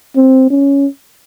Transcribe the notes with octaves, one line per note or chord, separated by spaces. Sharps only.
C4
C#4